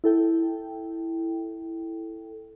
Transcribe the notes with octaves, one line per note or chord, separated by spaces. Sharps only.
E4 A4 G5